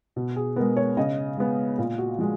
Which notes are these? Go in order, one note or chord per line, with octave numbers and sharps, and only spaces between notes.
B2
G#4
G#3 B3 A#4
C#5
C#3 D#5
G#3 B3
A#2
F#4
F3 G#3